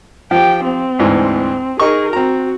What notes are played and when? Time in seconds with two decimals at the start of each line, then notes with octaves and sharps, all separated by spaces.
0.31 F3 G4 G5
0.64 C4
0.99 D2 G#2 E3
1.80 D#4 G#4 A#4 D#5 C#6
2.13 C4 F#4 A#5